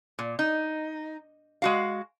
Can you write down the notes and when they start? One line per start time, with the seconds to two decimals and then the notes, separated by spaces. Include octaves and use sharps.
0.19 A#2
0.39 D#4
1.62 G#3 F#4 F5